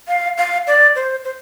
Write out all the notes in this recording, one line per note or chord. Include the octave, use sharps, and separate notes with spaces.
F5
F5
D5
C5
C5